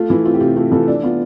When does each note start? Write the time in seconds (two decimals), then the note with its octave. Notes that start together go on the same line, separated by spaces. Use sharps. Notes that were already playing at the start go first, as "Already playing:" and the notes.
Already playing: A3 F4
0.10 E3 E4
0.25 C4 F4
0.34 G4
0.40 C3 F4
0.56 A3 F4
0.71 E3 F4 A4
0.88 D4
1.03 B3 F4